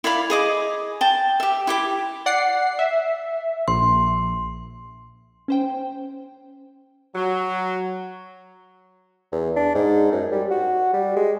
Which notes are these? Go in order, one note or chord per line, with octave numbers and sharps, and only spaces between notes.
E4 D5 F5 B5
G#4 D#5 D6
G5 A5
G4 E5
E4 G4 D6
D5 F#5 C7
E5
A#1 C6
C#4 C5 G5
F#3
E2
D4
G#2
F#2
G3
F#4
G3
G#3